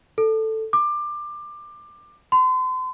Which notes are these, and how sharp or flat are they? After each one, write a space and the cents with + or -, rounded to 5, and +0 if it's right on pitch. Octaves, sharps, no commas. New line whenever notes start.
A4 +5
D6 +20
C6 -40